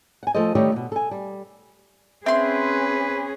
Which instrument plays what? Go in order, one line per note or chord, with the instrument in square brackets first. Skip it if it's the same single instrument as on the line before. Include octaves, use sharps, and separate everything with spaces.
[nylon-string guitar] F#5 G#5
F3 A3 A4 C5 D#5
D#3 G3 A3 G4 C#5 D#5
E2 B2
A4 G#5
G3
[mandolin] C4 C6 [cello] C#4 G#4 [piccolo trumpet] B4 [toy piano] E5